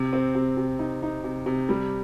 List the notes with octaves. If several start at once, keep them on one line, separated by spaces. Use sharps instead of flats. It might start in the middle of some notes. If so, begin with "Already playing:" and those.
Already playing: C3
C4
C3
C3
D#4
D#4
C3
C3
G3